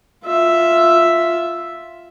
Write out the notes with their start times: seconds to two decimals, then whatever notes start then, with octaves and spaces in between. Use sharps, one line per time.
0.25 F4 E5